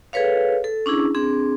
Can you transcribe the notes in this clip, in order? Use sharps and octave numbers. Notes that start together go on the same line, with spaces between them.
G#4 A4 B4 C#5 F5
A4
C#4 D4 E4 G#4
C4 D4 G#4